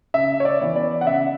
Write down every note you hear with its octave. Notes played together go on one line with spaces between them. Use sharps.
C#3 E5
C#5
D5
E3 B3
D5
F#5
C#3 E5